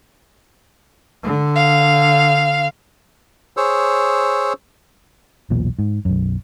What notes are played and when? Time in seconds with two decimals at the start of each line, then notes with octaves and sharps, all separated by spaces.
1.23 D3
1.55 F5
3.57 G#4 C5 C#5 E6
5.50 B1 E2 A#2
5.79 G#2
6.05 B1 F#2